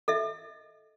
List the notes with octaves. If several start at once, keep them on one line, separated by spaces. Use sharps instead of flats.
A4 D#5 E5